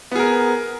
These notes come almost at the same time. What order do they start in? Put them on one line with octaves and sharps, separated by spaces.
B3 G#4 A#4